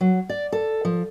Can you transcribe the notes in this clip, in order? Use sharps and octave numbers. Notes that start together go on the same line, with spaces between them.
F#3
D5
A4
F3